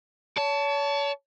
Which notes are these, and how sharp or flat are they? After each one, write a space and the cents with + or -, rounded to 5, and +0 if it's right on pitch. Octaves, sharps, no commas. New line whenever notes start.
C#5 +35 A5 +0